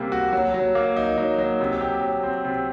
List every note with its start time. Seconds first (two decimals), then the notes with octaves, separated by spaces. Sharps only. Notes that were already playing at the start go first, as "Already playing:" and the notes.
Already playing: C3 G3 A#3
0.12 F#4
0.33 F#3
0.54 F#3
0.75 A#3
0.97 D#4
1.18 F#3
1.38 F#3
1.60 C3
1.81 G4
2.02 F#3
2.23 C4
2.45 C3